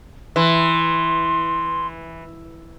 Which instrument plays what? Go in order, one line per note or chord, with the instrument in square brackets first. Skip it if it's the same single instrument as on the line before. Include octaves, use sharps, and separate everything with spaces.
[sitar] E3 [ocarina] C6